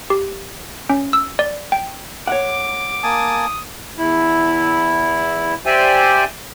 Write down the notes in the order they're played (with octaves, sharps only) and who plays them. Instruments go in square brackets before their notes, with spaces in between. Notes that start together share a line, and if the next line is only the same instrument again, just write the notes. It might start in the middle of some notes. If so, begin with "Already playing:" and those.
[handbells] G4
C#4
E6
D5
G5
[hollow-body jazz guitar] C#5 F#5 [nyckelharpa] D6
[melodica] A#3 G#5 A5 [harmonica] D#6
[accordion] E2 E4
G4 C5 D5 E5 G5 G#5